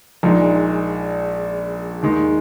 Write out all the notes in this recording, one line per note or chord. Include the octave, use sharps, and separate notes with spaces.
A#1 A#2 G#3 D#4
D#2 D#3 G#3 D#4